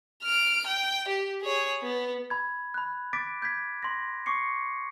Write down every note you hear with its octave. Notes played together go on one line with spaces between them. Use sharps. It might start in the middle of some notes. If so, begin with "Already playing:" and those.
F6 D7
G5
G4
G#4 C#5
B3
B5 G#6
B5 F#6
D6 A6 B6 D7
G6 G#6 B6
C6 A#6
C#6 D6 C7 C#7